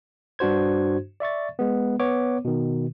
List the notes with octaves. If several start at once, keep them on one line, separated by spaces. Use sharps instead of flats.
G2 D4 F#4 C5 G#6
D5 E5 C#6 A6
G#3 B3
B3 C#5 D6
B2 D#3